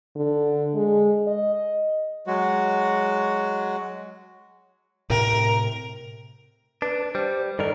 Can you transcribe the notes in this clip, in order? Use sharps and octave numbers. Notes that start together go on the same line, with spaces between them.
D3
G#3
D#5
F#3 G#3 F#4
A2 C3 A#4
D4 B4
G3 C5
G2 D#3 A4 A#4 D5 D#5